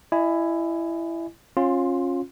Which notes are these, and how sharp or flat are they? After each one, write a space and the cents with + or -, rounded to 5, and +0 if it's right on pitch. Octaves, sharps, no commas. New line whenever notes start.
E4 +15 D#5 -20 G#5 +0
C#4 -25 F4 +20 C6 +0